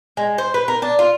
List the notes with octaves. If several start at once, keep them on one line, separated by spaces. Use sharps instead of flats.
G#3
C5
B4
A#4
D4
F4